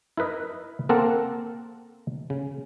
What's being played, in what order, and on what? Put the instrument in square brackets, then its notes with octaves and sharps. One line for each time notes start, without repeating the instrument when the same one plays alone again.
[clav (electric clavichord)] E4 A#4 B4 D#5
A#3 C4 A4 A#4 F#5
C#3